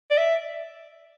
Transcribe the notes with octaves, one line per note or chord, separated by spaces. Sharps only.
D5
E5